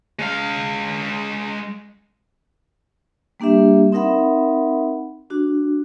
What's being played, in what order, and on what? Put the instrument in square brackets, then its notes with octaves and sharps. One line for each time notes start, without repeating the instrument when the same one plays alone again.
[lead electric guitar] G#3 F5
[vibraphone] G3 A#3 D4 G4 E5
C4 D#4 A#4 E5 F#5 B5
D4 F#4